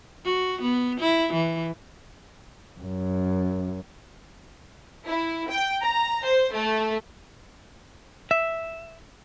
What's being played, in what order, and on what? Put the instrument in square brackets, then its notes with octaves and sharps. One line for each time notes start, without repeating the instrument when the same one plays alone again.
[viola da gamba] F#4
B3
E4
E3
[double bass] F#2
[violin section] E4
G5
A#5
C5
A3
[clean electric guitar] E5